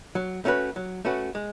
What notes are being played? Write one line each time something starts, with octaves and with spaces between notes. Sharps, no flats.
F#3
A3 C#4 F#4 B4
F#3
A3 C#4 F#4 B4
G#3